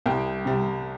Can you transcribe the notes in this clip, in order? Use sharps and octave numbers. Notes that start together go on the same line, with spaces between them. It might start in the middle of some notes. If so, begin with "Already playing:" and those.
C2 G5
C3 G3